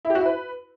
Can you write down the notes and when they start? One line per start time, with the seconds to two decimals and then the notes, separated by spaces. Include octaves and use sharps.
0.05 E4
0.10 G4
0.15 F#4
0.20 E4
0.26 B4